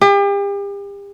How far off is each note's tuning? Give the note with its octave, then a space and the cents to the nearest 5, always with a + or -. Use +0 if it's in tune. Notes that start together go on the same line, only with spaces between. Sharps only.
G4 +40